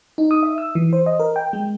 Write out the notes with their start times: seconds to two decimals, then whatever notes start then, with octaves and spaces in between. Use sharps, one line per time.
0.18 D#4
0.31 D#6
0.43 E5
0.58 E6
0.75 E3
0.93 C5
1.06 D#5
1.20 A#4
1.36 G5
1.53 G#3